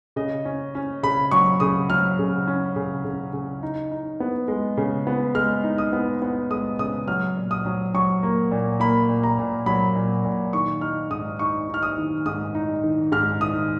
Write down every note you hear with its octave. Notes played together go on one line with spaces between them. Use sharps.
C#3 D#5
C#4
C#4
C#3 B5
F#3 C#6
C#3 D#6
F#3 F6
C#3
C#4
C#3
C#3
C#3
D#4
D#4
B3
G#3
C#3
B3
G#3 F6
D#4
D#6
B3
B3
G#3 D#6
C#3 D#6
F#3 F6
A#2
D#6
F#3
F#3 C#6
A#3
A#2
A#3 B5
A#2
A#5
A#2
F#3 B5
A#2
A#2
D#3 C#6
D#4 F6
G#2 D#6
D#4 C#6
D#4
F6
D#6
D#3
G#2 D#6
D#4
D#3
G#2 F6
D#3 D#6